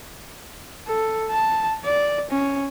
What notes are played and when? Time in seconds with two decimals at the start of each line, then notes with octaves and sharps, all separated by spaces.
0.87 A4
1.30 A5
1.85 D5
2.31 C#4